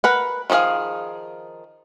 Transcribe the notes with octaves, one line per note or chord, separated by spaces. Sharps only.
A#4 B4 F#5
D#3 F3 A#3 G#4 F5